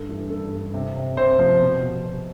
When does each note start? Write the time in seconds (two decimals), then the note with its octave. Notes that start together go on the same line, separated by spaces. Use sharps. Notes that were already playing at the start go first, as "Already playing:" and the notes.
Already playing: G2 A4
0.09 E3
0.30 G2 A4
0.52 G2
0.74 C3
0.96 C3
1.17 C3 C5
1.39 F3
1.61 B2
1.82 B2
2.04 B2